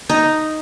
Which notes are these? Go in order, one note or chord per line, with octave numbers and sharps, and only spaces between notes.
D#4